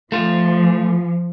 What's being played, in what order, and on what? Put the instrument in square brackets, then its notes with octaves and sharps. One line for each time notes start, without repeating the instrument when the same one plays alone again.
[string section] F3 [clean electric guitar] A3 F4